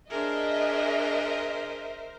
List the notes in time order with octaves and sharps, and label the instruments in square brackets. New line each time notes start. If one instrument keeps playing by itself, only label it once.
[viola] D4 G#4 [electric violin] A#4 C5 [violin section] D#5 E5